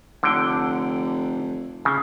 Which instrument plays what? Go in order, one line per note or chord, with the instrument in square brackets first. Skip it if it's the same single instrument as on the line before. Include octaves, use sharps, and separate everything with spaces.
[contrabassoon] F1 [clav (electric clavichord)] D3 G5
[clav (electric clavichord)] C#3